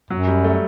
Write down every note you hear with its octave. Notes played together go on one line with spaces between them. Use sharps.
F#2 F#3
G3
A3